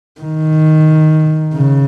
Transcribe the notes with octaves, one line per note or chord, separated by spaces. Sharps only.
D#3
C#3